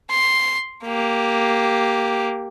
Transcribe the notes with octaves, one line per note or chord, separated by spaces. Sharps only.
C6
A#3 G4